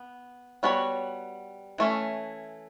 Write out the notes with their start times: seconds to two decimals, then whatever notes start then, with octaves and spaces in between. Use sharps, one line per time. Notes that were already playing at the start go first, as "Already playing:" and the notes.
Already playing: B3
0.63 G3 B3 F#4 A4 C#5
1.78 E3 A3 C#4